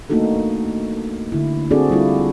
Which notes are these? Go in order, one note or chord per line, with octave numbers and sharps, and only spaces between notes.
A3 A#3 D4 D#4 F#4 A4
D3 E4
C4 D4 F#4 G#4 A4 D5
G3 E4 F4